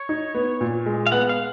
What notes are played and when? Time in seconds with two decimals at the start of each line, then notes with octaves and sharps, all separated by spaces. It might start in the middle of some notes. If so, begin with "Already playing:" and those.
Already playing: C#5
0.09 D#4
0.35 B3
0.61 A#2
0.86 G#3
1.07 F5
1.12 B3 F#5
1.29 F5